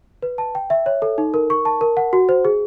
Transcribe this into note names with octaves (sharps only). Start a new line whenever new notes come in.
B4
A5
G5
E5
C#5
A4
D#4
A#4
C#6
A5
A#4
F#5
F#4
C5
G#4